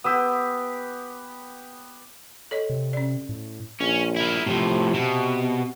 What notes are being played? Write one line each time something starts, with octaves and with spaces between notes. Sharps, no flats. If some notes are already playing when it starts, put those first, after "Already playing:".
B3 G4 D#6 E6
A4 C#5 D#5
C3
C#4 D5
A2
A#1 C#4
E4 A#4
A2 C3 F3
B2